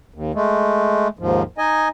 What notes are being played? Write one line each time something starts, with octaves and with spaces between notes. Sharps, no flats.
D#2
G#3 A3
D#2 G#2 F3
D#4 D#5 G#5